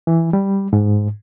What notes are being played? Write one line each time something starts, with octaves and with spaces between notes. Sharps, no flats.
E3
G3
G#2